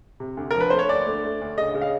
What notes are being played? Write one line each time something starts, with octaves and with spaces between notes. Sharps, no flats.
C3
D2
F3 A#4
B4
A3 C5
C#5
D2 D5
A3
A3
D2
C#3 D#5
C#3
F5